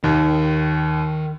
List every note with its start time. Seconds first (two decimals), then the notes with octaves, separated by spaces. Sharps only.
0.04 D#2 D#3